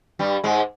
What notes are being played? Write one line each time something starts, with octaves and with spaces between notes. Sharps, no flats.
G2 G3
G#2 G#3